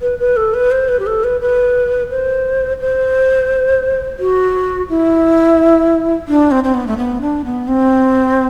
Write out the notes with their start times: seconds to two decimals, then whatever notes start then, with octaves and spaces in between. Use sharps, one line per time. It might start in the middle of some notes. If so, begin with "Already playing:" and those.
0.02 B4
0.19 B4
0.37 A4
0.54 B4
0.71 C5
0.89 B4
0.99 G4
1.07 A4
1.24 B4
1.41 B4
2.10 C5
2.80 C5
4.19 F#4
4.89 E4
6.28 D4
6.51 C4
6.64 C4
6.74 B3
6.87 A3
6.97 B3
7.21 D4
7.45 B3
7.68 C4